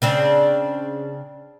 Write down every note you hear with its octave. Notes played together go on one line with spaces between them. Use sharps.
C#3 C4 D4